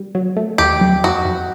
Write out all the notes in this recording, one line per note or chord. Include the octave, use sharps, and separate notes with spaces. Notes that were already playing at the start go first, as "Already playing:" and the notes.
Already playing: G3
F#3
A3
D#2 G4
F#3
F2 F#4
F2